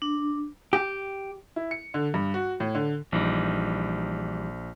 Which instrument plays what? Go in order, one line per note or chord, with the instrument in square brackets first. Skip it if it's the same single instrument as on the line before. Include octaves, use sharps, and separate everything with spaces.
[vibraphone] D4
[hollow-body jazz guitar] G4
[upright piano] E4
C#7
D3
G2
F#4
A2
D3
[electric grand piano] A#1 [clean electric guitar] E3 G3 D#4